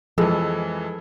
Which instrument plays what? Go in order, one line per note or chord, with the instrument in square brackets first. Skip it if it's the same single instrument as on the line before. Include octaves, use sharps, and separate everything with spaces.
[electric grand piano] F2 E3 [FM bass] F3 [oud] G#3 [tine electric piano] A4